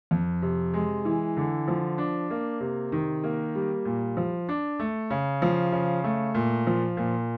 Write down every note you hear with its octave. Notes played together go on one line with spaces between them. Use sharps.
F2
C3
G#3
E3
D3
F3
D4
A#3
C3
D#3
A#3
G3
A#2
F3
D4
A3
C#3
F3
C#3
A3
A#2
F3
A#2